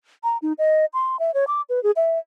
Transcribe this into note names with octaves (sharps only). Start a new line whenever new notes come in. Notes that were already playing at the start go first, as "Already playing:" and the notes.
A#5
D#4
D#5
C6
E5
C#5
D6
B4
G#4
E5